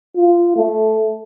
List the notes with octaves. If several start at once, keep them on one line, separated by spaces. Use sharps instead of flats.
F4
A3